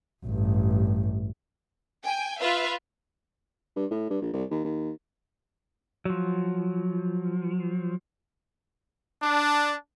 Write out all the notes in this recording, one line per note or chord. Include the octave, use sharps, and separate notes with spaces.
A1 G2
G5 G#5
F4 B4 E5 F5
G2
A2
G2
A#1
C2
D#2
D#2
F3 F#3
D4